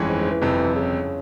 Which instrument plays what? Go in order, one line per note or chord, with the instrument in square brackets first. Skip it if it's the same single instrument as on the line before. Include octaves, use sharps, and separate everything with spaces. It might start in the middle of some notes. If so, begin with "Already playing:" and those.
Already playing: [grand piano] G1 F2 E3 G#3 C#4
[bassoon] G#2
G#2
E3
[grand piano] G1 F2 C3
[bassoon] C#3